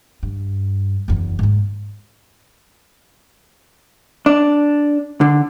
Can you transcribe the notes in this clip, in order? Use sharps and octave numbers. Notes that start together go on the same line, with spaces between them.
G2
F#1 E2
G#2 A#3
D4
D3